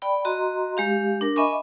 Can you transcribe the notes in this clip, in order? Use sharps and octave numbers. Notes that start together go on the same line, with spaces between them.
D5 G5 B5
F#4 D#5 A#5 C6
G#3 G4 F5
D4 A#4
D#5 E5 G#5 B5 C#6 D6